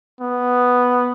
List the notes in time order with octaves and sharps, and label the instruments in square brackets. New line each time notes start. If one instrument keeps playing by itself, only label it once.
[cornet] B3